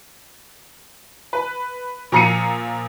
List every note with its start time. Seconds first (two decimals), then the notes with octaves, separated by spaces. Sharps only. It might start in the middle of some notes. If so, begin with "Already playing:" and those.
1.33 B4
2.12 A#2 F3 A#5 C7 C#7 D#7